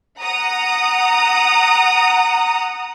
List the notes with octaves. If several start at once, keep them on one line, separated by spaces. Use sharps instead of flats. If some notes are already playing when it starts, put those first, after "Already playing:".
F#5 A#5 D#6